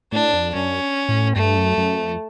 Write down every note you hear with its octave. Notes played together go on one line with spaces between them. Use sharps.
A2 D4
F2
F#2 C#4
A2
G2 A3
F#2
F#2
F2